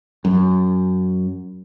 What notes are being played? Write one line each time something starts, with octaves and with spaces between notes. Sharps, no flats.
F#2